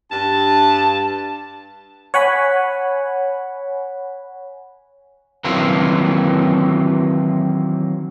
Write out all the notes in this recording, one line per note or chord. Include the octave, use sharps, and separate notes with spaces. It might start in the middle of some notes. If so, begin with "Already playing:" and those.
G2 A5
C#5 F#5 G#5 B5
D#3 E3 F#3 A#3 C4 F4